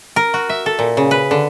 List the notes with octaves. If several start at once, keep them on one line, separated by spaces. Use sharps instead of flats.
A#4
F#4
E5
A4
A#2
C#3
B4
D3